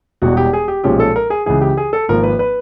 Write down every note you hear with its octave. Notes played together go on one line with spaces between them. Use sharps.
E1 E2 B2 G3 F#4
G4
G#4
G4
B1 A#2 F3 G#3 C#4 G4
A4
A#4
G#4
C#2 C#3 E3 G#4
G4
G#4
A4
G#1 G#2 F3 A#3 A#4
B4
B4